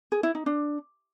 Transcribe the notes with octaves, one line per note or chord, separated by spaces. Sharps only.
G#4
E4
D#4
D4